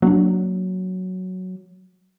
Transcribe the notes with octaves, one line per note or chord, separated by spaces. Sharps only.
F#3 A#3 C#4 D4